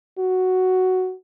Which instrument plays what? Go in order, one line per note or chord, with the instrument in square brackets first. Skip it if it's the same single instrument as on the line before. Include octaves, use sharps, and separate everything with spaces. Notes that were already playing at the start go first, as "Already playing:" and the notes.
[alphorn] F#4